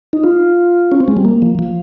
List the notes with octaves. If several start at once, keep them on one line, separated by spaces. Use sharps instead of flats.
D#4
F4
C#4
C4
G#3
G3
A#3
F3
F3